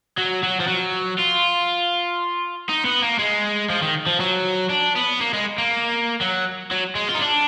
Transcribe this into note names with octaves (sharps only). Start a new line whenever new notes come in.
F#3
F#3
F3
F#3
F4
D#4
B3
A#3
G#3
F3
D#3
F3
F#3
D4
B3
A#3
G#3
A#3
F#3
F#3
G#3
F4
D#4
D4